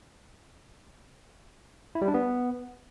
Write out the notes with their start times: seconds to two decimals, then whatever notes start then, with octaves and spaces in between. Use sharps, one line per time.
1.95 E4
2.02 G3
2.08 D4
2.14 B3